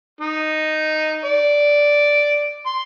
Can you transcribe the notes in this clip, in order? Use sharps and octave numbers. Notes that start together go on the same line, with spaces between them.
D#4
D5
C6